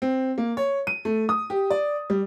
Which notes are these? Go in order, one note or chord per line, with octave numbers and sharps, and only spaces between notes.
C4
A#3
C#5
D#7
A3
D#6
G4
D5
G3